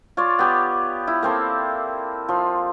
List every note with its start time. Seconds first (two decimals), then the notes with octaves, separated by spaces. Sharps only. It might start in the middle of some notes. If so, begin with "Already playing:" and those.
0.17 F4 C#5 D5
0.39 B3 G4
1.07 E4
1.23 A#3 C4 A4
2.29 F3